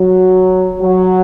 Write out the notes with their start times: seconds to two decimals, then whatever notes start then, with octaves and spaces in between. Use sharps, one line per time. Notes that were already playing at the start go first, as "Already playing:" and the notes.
Already playing: F#3
0.78 F#3